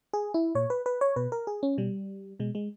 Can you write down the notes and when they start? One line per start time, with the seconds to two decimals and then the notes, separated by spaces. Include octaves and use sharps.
0.13 G#4
0.34 E4
0.55 A#2 C#5
0.70 B4
0.86 B4
1.01 C#5
1.16 B2 B4
1.32 A#4
1.47 G#4
1.63 C#4
1.78 B2 G3
2.39 B2 G#3
2.55 G#3